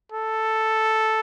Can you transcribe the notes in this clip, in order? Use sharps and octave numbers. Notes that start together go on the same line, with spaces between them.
A4